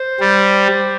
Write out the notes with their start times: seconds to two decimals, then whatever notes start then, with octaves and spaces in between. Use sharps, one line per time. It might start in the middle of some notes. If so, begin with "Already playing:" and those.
Already playing: C5
0.20 G3